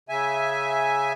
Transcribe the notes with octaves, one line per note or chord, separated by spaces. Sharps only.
C#3 E5 G#5